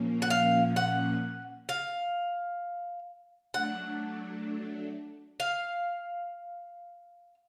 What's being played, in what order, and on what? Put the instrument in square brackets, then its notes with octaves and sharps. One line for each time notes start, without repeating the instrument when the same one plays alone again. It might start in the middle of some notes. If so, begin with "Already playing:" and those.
Already playing: [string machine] A#2 F3 A#3 C#4
[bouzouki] F#5
F5
F#5
F5
[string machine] F#3 A3 D4 [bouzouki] F#5
[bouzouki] F5